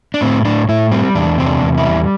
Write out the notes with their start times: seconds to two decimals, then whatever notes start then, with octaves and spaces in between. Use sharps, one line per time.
0.14 D4
0.21 A2 C4
0.45 A2 D4
0.69 A2 E4
0.92 G3 C4
1.15 E2 D4
1.38 C3 C4
1.47 D4
1.62 E2
1.78 E4
1.85 G3